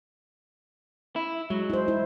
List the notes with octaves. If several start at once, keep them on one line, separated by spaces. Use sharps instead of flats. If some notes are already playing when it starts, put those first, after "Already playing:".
E4
F#3 G#3
E4 C5
E4